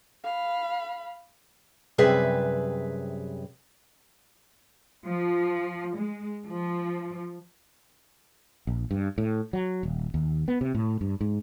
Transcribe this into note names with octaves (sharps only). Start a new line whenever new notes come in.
F5 B5
F#2 C3 G3 G#4 B4 E5
F3
G#3
F3
A#1
G2
A2
F#3
D#1
D#2
B3
C3
A2
G2
G#2